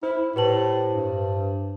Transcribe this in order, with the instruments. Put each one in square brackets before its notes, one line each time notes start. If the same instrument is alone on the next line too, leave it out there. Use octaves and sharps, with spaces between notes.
[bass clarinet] E4 [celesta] C5
[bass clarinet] A2 [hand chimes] G4 C5 A5 [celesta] B4 F#7
[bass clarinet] G2